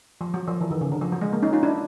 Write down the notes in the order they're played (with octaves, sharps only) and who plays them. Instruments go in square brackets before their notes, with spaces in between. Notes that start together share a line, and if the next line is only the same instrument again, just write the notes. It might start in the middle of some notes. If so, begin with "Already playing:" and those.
[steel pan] F3
F#3
F3
E3
D#3
C#3
D3
F3
F#3
G#3
A#3
C#4 D#4
D#4 F4
D4 E4